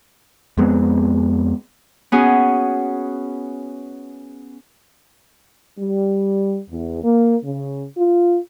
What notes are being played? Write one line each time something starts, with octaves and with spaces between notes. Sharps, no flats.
F2 G#3 B3 C4
B3 C#4 F#4 G#4
G3
E2
A#3
C#3
F4